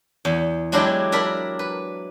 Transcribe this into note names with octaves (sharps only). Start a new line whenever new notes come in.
E2
F#3 G#3 D4 E4 G4 D5
D4 A#4 D5 E5 B5
B4